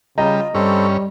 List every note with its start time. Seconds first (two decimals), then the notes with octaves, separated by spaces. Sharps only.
0.18 C#3 G3 F4 D#5 A#5
0.54 G2 G3 C4 C#4 A4